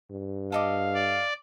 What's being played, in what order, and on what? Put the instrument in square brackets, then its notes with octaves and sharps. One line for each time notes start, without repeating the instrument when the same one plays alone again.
[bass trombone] G2
[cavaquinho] A4 D#5 D6 [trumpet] F5
[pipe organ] D5